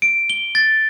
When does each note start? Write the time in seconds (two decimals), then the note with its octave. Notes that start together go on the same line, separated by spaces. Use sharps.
0.02 D7
0.30 G7
0.55 A6